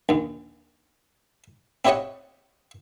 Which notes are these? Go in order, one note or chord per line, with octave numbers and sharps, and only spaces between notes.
A#1 D#2
C4 E4 G4 C#5 D#5 F#5